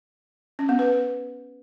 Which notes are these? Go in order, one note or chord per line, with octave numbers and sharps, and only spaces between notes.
C#4
B3
B4